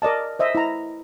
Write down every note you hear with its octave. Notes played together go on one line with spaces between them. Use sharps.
A#4 D5 D#5 A5
C5 D#5 E5
E4 A#5